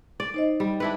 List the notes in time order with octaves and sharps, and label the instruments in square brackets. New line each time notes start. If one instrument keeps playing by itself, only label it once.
[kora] D5
[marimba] D#4 C5 D#5
[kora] G3
D4 E4 B4